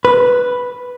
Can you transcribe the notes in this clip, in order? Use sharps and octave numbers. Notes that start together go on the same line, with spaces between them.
B4